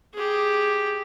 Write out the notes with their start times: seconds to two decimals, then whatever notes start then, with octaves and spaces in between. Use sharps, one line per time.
0.14 G4 G#4